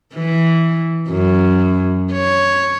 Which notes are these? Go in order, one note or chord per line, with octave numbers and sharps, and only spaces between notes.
E3
F#2
C#5